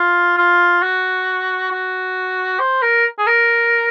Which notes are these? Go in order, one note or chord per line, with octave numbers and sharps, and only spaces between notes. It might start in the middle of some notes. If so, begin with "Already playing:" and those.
Already playing: F4
F4
F#4
F#4
C5
A#4
G#4
A#4